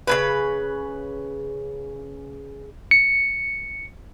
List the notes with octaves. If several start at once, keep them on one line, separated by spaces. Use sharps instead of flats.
C#3 F#3 B4
C#7